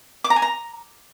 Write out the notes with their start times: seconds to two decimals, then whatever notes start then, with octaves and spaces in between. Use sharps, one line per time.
0.24 D6
0.30 A#5
0.36 G#5
0.42 A#5